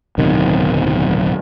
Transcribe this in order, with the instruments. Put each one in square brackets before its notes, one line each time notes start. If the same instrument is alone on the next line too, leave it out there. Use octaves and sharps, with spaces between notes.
[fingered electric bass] D1 B1 C3 D#3